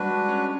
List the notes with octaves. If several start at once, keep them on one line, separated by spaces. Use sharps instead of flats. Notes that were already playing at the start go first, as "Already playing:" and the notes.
Already playing: G3 G#3 D4 F#4 B4
G#3
C#4